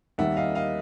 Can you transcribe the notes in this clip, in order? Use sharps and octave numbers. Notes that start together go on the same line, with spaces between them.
D#2 D#3 G3 A#3 E5 F#5
D#5 F5
D#5 F5